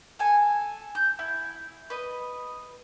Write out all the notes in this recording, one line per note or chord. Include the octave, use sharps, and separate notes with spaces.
A4 G#5
G6
E4
B4 D#5